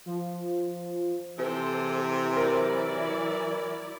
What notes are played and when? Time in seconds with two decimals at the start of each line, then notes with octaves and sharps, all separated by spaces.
0.06 F3
1.38 C3 E3 A4 C5
2.37 F#3 E4 A#4 D5